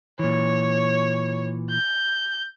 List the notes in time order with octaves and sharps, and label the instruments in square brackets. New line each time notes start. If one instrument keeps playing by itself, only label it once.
[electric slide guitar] A#2 E3 [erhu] C#5
[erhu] G6